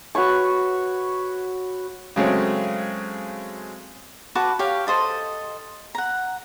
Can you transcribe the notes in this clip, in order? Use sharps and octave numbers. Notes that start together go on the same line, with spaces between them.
F#4 B4 C#5 C#6
C#3 F#3 G#3 A3 C4 C#4
F#4 B4 A5 D6
G4 C#5 F5
A4 C5 D#5 A5
F#5 A#5